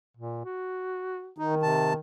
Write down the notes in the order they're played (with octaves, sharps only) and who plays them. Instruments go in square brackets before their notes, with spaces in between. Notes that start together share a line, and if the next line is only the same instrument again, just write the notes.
[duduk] A#2
F#4
[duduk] D#3 [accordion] D#4
[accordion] C3 A5